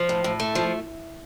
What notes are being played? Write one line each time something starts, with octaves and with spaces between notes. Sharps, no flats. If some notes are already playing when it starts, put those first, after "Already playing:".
Already playing: F3
A2
A2
A3
F3